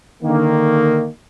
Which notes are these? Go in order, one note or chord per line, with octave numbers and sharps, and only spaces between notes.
D3 D#3 A#3